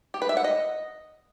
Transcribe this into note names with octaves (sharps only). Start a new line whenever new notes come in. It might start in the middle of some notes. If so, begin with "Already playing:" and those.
G4
B4
E5
F#5
D#5